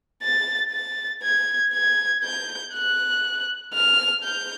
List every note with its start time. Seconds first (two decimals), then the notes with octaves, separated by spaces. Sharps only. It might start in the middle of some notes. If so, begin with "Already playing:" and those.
0.22 A6
0.72 A6
1.23 G#6
1.73 G#6
2.24 G6
2.74 F#6
3.74 F6
4.24 G6